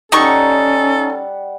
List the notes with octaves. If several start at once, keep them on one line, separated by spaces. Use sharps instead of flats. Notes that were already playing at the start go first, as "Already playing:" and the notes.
G3 C#4 D#4 A4 F#5 C#6